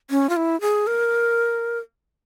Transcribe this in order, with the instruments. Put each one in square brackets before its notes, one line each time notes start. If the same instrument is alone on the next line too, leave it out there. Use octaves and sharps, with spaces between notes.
[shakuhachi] C#4
F4
E4
G#4
A#4